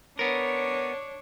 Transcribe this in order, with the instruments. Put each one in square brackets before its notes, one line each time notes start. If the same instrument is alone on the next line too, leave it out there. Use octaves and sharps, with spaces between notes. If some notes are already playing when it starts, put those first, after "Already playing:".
[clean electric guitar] B3 A#4 [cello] D4 C#5